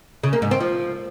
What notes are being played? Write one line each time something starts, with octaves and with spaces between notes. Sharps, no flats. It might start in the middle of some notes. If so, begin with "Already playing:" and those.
C#3
A#3
G#2
C4
F3